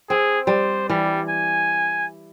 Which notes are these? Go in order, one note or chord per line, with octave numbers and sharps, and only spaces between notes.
C4 G#4
G3 C5
E3 G3
G#5